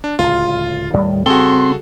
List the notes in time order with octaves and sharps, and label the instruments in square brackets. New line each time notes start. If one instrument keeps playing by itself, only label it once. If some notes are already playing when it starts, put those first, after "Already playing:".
[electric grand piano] D4
[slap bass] D1 C#2 [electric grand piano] F4
[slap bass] D#2 A2 D#3 [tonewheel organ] G3
[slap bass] C#3 G3 [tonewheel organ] C4 C6 [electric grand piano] F#4 G#4 A4